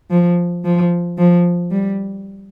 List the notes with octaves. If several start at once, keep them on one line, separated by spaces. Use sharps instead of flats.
F3
F3
F3
G3